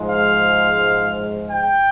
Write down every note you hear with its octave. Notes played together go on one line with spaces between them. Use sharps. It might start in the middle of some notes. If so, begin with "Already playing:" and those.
Already playing: G#2 F3 G#3
F5
G5